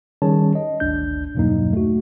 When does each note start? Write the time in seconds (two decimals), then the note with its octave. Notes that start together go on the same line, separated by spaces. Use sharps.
0.22 D#3 G3 C#4 G#4 C#5 A5
0.55 D#5
0.80 G#1 D2 D4 G6
1.35 E2 G2 B2 F#3 A#3 D#4
1.73 A3 F#4